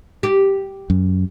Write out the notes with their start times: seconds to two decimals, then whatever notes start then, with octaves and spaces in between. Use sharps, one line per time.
0.23 G4
0.90 F#2